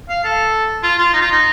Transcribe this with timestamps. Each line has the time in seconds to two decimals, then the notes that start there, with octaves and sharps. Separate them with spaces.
0.09 F5
0.24 A4
0.83 F4
0.98 F4
1.13 D#4
1.22 F4
1.31 D#4